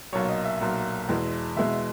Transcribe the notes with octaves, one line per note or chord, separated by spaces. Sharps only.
B1 A#2 F#3 C#5
D#5
E5
B1 A#2 F#3
E2 B2 G#3
E2 B2 G#3 E5